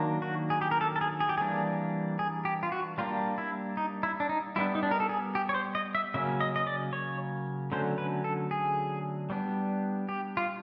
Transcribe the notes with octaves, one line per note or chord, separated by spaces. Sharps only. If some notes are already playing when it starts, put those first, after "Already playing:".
Already playing: D#3 F#3 A#3 D4
F#4
G#4
G4
A#4
A4
A4
G#4
G#4
G4
E3 G3 A#3 D4 G#4
G#4
G4
F4
F#4
G3 A#3 D4 F4
E4
D#4
E4
D4
D#4
G3 B3 D4 E4
D#4
D4
A#4
A4
G#4
G4
C#5
C5
D#5
E5
C#3 F#3 A#3 C#4 E5
D#5
D#5
D5
C#5
D3 F#3 A3 C#4 C5
B4
A4
G#4
G3 B3 D4
G4
F4